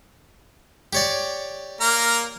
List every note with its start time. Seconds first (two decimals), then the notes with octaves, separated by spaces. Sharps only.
0.93 G4 C#5 D5
1.81 A#3 A#5 F6